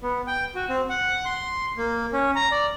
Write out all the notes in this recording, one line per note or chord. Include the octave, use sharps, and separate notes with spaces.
B3
G5
F#4
C4
F#5
C6
A#3
C#4
A#5
D5